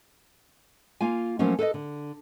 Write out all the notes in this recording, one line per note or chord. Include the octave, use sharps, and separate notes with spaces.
A#3 F4 G#5
F3 F#3 A3 A#3 C#4
A4 B4 C5 D#5
D3